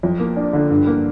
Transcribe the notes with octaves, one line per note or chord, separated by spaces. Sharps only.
F2
A#3
D4
D3
G2
A#3